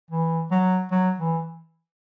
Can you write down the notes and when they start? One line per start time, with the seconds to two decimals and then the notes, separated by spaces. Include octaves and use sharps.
0.11 E3
0.51 F#3
0.91 F#3
1.18 E3